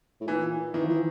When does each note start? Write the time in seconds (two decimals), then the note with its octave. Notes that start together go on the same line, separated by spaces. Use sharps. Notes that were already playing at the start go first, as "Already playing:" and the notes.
0.21 A2
0.27 A#2 E3
0.74 D#3 E3
0.85 F3
0.89 E3